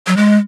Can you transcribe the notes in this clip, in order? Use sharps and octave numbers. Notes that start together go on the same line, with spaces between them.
F#3
G#3